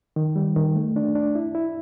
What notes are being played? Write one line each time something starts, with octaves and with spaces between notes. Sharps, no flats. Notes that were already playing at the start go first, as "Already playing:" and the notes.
D#3
G3
D#3
A3
D4
D4
E4
E4